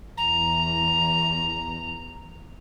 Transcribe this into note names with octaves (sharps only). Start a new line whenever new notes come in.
E2 A#5